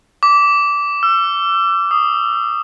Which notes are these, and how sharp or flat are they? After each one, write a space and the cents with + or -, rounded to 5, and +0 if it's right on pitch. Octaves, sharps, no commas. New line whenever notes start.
D6 -20
E6 +35
D#6 -15